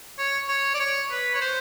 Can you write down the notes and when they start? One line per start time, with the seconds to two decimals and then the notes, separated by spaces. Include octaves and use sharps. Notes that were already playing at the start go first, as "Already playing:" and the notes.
0.18 C#5
0.48 C#5
0.74 D5
0.80 C#5
1.11 B4
1.35 C#5
1.41 C5